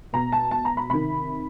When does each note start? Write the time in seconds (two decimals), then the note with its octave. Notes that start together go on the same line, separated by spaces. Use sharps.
0.13 B2 A#5
0.32 A5
0.51 A5
0.65 A#5
0.77 B5
0.90 C3 D#3 B5